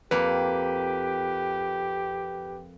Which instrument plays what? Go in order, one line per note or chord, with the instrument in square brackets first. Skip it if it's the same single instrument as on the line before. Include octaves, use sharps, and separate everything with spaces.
[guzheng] F2 A#3 [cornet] G4 [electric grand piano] B4